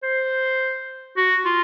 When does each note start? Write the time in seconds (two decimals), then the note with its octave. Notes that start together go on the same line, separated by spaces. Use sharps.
0.03 C5
1.17 F#4
1.45 F4